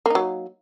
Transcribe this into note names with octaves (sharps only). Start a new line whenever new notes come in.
F#3 A#3 D#4